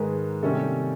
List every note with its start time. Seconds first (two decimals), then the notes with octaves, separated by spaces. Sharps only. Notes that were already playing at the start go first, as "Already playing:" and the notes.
Already playing: G#2 D#3 G#3 A#4 B4
0.42 C3 D#3 G3 A#3 C#4 A4